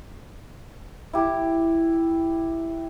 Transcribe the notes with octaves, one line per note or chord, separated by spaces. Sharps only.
E4 G4